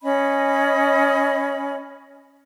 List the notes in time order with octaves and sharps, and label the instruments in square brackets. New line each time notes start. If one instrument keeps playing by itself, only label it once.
[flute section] C#4 D#5 B5